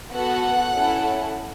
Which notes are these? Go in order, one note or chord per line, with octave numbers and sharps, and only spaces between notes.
B3 F#4 A4 F#5
C#4 E4 A4